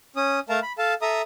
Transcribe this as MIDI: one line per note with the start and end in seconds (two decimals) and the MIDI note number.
0.16 0.40 61
0.16 0.40 87
0.49 0.60 57
0.49 0.60 70
0.49 0.60 77
0.49 0.60 81
0.49 0.60 82
0.62 0.72 83
0.78 0.94 69
0.78 0.94 77
0.78 0.94 81
1.02 1.22 69
1.02 1.22 76
1.02 1.22 82
1.02 1.22 87